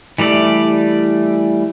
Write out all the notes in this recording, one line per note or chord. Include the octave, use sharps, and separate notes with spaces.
E3 G3 A3 D5